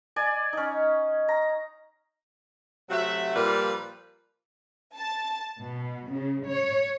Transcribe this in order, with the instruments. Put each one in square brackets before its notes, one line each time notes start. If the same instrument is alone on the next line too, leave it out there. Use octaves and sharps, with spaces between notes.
[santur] D5 G#5
C#4 D#4
A#5
[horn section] C3 F#3 A3 F#4 E5 F#5
A#2 F3 G3 B4 F5
[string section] A5
B2
C#3
C#5